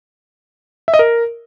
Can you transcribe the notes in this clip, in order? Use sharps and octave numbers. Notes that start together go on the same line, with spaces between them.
E5
D#5
A#4